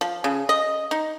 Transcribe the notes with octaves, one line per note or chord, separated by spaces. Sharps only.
F3
C#3
D#5
D#4